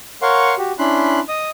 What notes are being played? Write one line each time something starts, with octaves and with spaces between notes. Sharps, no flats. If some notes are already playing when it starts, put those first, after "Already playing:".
A#4 C#5 F5 F#5 C6 C#6
F#4 G4
C#4 D4 E4 B5 C6 F#6
D#5 D#6